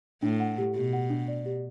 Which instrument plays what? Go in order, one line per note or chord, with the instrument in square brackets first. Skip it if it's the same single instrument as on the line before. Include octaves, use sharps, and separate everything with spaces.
[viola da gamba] A2 [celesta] D4
[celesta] F#5
G4
[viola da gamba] B2 [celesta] G4
[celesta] F#5
D4
D5
G4